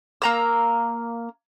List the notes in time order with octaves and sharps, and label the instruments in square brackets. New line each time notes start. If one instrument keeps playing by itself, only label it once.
[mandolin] A#3 A#5 E6